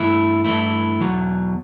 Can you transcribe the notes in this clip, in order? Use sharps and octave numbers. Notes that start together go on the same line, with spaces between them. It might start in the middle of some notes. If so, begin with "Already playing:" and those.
Already playing: G2 E3 A3 E4
G2 E3 A3 E4
E2 B2 F#3